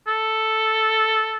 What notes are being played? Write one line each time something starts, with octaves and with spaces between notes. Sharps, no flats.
A4